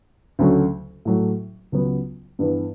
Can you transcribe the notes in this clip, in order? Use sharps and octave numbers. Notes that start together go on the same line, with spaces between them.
D2 C#3 F#3 A3 C#4
A2 F#3 A3
C#2 C#3 F#3 B3
G2 E3 B3